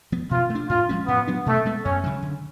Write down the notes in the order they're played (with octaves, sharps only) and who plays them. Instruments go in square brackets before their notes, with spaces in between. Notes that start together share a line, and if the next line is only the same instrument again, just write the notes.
[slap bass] F3 B3
[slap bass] B2 [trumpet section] F4
[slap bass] A3
D4
[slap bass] A2 [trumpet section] F4
[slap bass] F3 G#3 C#4
[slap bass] A2 [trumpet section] B3
[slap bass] F#3 B3 D4
[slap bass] B2 [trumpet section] A3
[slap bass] G#3 B3
[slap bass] F#2 [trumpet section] C#4
[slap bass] C#3 F#3
D3